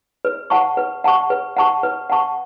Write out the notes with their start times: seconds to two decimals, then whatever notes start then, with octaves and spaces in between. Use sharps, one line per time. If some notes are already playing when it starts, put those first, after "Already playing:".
0.25 B4
0.50 F#5 A5 C#6
0.77 B4
1.04 F#5 A5 C#6
1.30 B4
1.57 F#5 A5 C#6
1.83 B4
2.10 F#5 A5 C#6